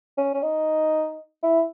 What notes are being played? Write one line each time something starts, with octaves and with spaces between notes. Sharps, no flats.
C#4
C#4
D#4
E4